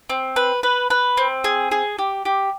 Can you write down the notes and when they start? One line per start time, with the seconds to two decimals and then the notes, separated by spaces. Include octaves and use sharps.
0.10 C4
0.36 B4
0.63 B4
0.90 B4
1.17 C4
1.44 G#4
1.71 G#4
1.98 G4
2.25 G4